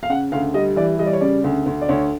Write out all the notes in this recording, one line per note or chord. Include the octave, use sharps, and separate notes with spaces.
F5
C#3 F#5
D2 F5
G3 D#5
E3 D5
G3 D#5
D5
C#5
C#3 D5
D2
D2
D5
D2 C#5